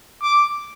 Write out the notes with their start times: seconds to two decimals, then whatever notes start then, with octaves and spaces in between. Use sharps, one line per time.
0.22 D6